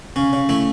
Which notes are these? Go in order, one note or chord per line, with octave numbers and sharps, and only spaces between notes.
C#3 C#4
C#3
A3 E4